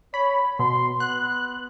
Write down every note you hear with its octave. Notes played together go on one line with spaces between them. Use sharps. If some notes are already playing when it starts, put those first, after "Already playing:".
C#5 B5
B2 C6
B3 F#6